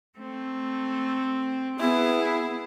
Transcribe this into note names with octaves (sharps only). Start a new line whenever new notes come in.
A3 C4
B3 E4 G#4